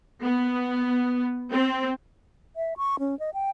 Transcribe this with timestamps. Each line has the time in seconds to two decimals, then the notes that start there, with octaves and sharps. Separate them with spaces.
0.23 B3
1.52 C4
2.56 E5
2.77 C#6
2.99 C#4
3.19 D#5
3.34 G5